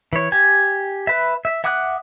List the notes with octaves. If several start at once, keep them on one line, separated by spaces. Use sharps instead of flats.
E3 C#5
G4 G#5
B4 E5
E5
E5 F#5 D6 D#6 F#6